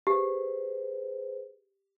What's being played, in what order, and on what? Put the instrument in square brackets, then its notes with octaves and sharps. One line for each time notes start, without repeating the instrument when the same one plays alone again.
[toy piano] G4 [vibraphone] G#4 B4 C5